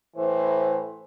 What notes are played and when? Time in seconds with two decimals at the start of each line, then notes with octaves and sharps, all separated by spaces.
0.17 A2 E3 C5